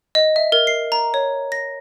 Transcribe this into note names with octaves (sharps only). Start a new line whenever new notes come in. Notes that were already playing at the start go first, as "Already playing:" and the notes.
D#5
E5
A#4
C7
A#5
C#5
A#6